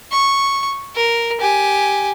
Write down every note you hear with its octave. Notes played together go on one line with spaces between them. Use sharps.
C#6
A#4
G4 G#5